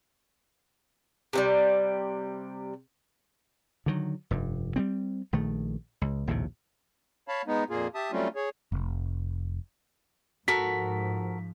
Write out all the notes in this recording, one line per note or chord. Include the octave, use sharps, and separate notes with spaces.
C3 E3 G3
D3 D#3 F#3
F1 G2
G3 G#3 C4
A#1 D#3 A3
C#2
A#1 D#2 A2 C3
C#5 F5 A5 B5
G#3 B3 D#4
F2 A#2 A#3 F4 G#4
G4 E5 A5 D#6
F#3 G3 A3 C4 C#4 F4
G#4 C#5
F1
G#2 F3 F#4 A4 A#4 B6